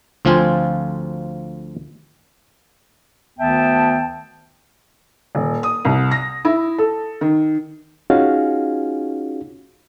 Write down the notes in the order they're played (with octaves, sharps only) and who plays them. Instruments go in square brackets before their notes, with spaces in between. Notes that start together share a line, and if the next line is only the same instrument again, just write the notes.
[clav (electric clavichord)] D2 F3 C4 F4 G#5
[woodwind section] D2 D#3 B3 E5 G5 A5
[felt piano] D#1
D#6
C2
A#6
E4
A4
D#3
[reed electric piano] C#4 D#4 F4 F#4 G#4 F5